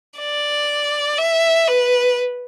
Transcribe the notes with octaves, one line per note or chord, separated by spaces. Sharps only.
D5
E5
B4